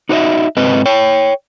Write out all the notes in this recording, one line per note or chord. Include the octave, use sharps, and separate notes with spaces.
D#4 F#4 C5 C#5 D#5 E5
G#2 C4 B4 D#5
C#5 G5